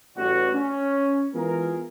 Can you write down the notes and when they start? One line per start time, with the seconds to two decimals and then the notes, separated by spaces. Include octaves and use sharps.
0.17 A1 G3 F#4
0.54 C#4
1.34 E3 G#3 B3 F4 G#4 A#4